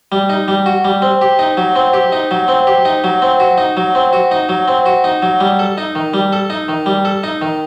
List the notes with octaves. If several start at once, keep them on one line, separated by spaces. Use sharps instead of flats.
G3
D#4
G3
F#4
G3
C4
G4
D#4
F#3
C4
G4
D#4
F#3
C4
G4
D#4
F#3
C4
F#4
D#4
F#3
C4
F#4
D#4
F#3
C4
F#4
D#4
F#3
G3
A4
D#4
D#3
G3
A4
D#4
D#3
G3
A4
D#4
D#3